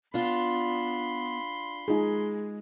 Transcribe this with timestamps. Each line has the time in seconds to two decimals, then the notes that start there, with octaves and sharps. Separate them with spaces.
0.14 B3 D4 F4 B5 C6
1.88 G#3 D#4 F4 G#4